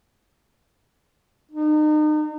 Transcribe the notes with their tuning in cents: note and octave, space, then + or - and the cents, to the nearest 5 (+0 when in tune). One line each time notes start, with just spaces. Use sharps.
D#4 -35